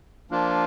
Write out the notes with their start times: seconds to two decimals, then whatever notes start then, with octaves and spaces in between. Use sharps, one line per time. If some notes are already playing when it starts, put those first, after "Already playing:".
0.31 F3 A#3 D4 F4